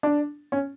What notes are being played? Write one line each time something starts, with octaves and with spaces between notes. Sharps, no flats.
D4
C#4